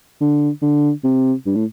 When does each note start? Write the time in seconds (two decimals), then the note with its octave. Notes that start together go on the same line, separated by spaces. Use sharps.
0.21 D3
0.62 D3
1.04 C3
1.46 G2
1.55 A2